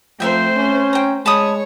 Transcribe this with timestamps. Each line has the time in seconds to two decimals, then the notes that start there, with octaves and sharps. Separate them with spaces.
0.20 F3 A3 C4 A#4 C5 E5 G5
0.57 C#4
0.93 G5 A#5
1.26 G#3 C#5 A5 B5 D#6